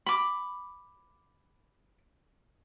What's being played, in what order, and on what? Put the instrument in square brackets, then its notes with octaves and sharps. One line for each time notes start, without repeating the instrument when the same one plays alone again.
[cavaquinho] B5 D6